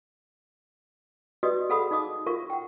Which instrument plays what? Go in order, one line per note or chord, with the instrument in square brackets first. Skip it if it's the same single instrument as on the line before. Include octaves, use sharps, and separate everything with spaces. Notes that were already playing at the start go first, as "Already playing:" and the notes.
[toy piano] F#4 G4 B4 D5 D#5 D#6
G#4 A4 F5 F#5 B5 D#6
D#4 D#5 F5 D6 D#6
F4 A#4 E5 F5 C#6
F#5 G5